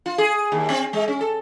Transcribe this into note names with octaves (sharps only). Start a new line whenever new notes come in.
F4
G#4
D#2
C4
G#3
C#4
A4